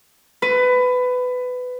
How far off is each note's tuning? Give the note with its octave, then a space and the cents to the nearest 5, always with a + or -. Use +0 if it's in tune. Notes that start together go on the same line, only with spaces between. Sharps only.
B4 +20